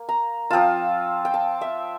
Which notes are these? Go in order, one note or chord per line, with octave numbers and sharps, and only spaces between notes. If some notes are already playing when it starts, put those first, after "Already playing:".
Already playing: A#3
A#5
F3 C4 F4 A5
G5
A5
E5